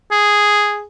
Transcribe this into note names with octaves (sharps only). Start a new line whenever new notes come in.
G#4